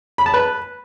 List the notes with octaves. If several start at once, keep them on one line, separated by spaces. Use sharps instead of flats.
B5
A5
B4